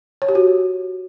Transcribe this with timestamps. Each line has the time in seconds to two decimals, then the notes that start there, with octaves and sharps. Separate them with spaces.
0.22 C#5
0.28 G4
0.35 F#4